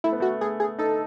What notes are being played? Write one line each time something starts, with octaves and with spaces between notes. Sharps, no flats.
A3 E4
B3
A3 F#4
A3 G#4
G#4
D#4 A4